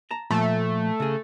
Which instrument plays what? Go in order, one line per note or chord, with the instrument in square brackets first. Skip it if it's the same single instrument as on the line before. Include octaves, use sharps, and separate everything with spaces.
[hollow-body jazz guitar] A5 A#5
[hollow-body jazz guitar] A#2 F3 A4 [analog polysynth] A3
[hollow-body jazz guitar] C#3 G#4